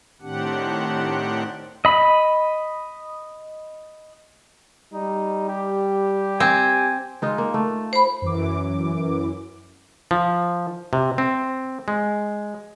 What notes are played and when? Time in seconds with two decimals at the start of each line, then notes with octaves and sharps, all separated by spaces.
0.22 A2 D#3 C4 D4 G4 F#5
1.85 D#5 B5
4.93 G3 D#4
5.49 G4
6.40 C4 G#5
7.22 G#3 D#4 F4
7.38 A#3
7.54 A3
7.93 C5 B5
8.22 F#2 E3 D6
10.11 F3
10.93 C3
11.18 C4
11.88 G#3